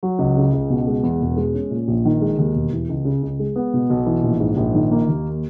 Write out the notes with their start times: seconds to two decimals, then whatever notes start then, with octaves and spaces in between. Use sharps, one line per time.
0.03 F#3
0.19 C#2
0.37 C#3
0.53 C#2
0.70 B2
0.87 G#3
1.03 E2
1.21 E1
1.37 G#3
1.54 C#4
1.71 A#2
1.88 A#1
2.05 D#3
2.21 G#3
2.38 D#2
2.54 E1
2.72 E3
2.89 C#2
3.05 C#3
3.23 C#2
3.39 G#3
3.56 B3
3.74 B2
3.90 B1
4.06 E3
4.23 A#1
4.40 G#2
4.57 A#1
4.74 D#3
4.92 A#3
5.08 D#2